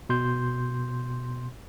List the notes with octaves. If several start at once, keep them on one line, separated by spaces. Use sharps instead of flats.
B2 C6 G6